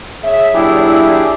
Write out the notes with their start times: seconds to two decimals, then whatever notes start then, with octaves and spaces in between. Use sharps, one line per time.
0.24 G#4 C#5 E5
0.54 A#2 F#3 D4 E4 G4 G#4